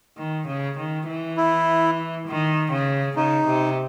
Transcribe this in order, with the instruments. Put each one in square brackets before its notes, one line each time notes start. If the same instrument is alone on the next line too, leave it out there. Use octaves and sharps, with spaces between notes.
[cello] D#3
C#3
D#3
E3
[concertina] E4
[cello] D#3
C#3
[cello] C#3 [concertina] D#4
[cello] C3